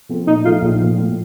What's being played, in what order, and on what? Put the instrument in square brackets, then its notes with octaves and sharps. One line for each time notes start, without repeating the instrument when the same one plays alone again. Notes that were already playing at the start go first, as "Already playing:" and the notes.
[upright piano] F3 C4 F4 A4
[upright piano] A#2 [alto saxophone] D#4
[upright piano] F3 A3 D#4 A4 [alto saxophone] F4
[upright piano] A#1
A#2 F3
A2